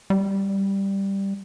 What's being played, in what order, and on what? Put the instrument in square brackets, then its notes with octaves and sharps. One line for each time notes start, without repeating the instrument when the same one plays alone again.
[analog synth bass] G3